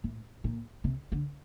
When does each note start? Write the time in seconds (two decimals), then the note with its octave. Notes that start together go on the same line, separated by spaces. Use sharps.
0.04 A2
0.44 A#2
0.84 C3
1.12 D3